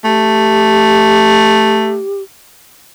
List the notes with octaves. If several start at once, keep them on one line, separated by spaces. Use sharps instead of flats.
A3 G4